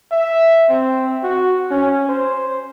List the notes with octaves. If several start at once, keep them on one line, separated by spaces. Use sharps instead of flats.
E5
C4
F#4
C#4
C5